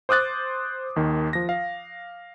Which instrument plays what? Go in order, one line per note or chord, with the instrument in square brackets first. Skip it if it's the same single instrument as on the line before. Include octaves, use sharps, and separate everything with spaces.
[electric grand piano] C5 D6 D#6 F#6 A6
D#2 D#3
F3 A#6
F5